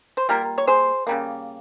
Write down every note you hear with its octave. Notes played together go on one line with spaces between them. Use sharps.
C5
G3 A#3 F4 G4 A#4
C#5
G#4 C5
C#3 G3 A#3